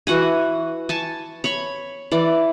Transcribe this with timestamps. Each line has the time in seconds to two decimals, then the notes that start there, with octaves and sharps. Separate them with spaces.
0.07 E3 F#4 F#5 G#5
0.89 G#5 A5 C#6
1.44 C#5 B5 C#6
2.12 E3 D5